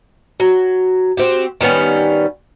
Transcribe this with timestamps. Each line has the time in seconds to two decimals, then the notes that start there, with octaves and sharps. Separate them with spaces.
0.40 F#3
1.17 C4 F#4 G4
1.61 D#3 G3 B3 C#4